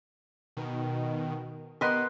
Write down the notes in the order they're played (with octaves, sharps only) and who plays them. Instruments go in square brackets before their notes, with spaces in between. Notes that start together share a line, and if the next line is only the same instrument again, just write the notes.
[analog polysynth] B2 D#3
[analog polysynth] B3 [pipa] G4 B4 D#5 [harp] A#4 C6 F#6